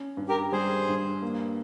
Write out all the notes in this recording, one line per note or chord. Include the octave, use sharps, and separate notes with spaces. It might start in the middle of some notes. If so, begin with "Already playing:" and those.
Already playing: C#4
G2
G4 A#4
G3 G#4 C5
G2
A#3